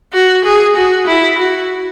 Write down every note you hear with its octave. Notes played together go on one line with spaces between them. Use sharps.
F#4
G#4
F#4
E4
F#4